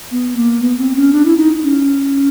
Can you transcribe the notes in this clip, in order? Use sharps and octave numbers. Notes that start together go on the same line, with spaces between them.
B3
A#3
B3
C4
C#4
D4
E4
D#4
C#4